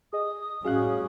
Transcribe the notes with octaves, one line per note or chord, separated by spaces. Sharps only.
G#4 D#5 D#6
A2 G3 C#4 F#4 G#4 F5 F#6